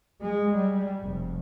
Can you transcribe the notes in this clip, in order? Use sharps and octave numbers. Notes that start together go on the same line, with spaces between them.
G#3
G3
F1